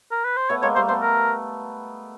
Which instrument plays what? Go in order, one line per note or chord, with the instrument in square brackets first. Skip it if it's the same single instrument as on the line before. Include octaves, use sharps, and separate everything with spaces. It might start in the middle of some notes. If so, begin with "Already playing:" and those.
[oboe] A#4
B4
C5
[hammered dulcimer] A3 B3 [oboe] C#5
[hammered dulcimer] G#3 A#3 [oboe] C#5
[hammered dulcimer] G3 A3 [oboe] C5
[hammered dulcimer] A3 B3 [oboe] C5
[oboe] A#4